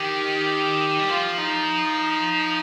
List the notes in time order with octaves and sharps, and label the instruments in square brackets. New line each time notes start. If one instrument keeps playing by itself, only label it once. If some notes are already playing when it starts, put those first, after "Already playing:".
Already playing: [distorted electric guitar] D#3 [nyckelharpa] G4
[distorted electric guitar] G3
[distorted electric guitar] F3 [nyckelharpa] F4
[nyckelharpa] D#4